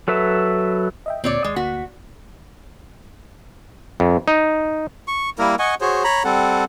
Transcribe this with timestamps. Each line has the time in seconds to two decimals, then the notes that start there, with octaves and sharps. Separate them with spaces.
0.08 F#3 A4 B4 E5
1.06 D#5 E5 G5
1.24 D2 A#2 C4 C#5 D5
1.44 D#2 G#3
1.56 D2 A#3 F#4 B6
4.00 F2
4.28 D#4
5.08 C#6
5.39 G3 A#3 E4 A#4
5.59 D#5 F#5 G#5 C#6
5.81 F#4 G#4 C5 C#5
6.04 C#5 A#5 B5
6.24 G3 C4 A4 F#5